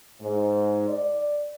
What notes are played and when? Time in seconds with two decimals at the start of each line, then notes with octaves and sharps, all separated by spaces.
0.21 G#2
0.89 D5